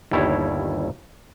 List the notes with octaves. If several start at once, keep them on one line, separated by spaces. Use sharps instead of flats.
G1 D#2 G3 E4 C#5